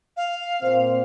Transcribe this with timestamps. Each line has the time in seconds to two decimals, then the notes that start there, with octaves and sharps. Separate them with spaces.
0.17 F5
0.62 A#2 C4 C5